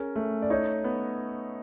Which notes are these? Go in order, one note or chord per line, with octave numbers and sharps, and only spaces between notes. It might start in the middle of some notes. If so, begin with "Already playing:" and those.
Already playing: C#4 G#4 A#4
A3
D5
D#4 C#5 D#5
B3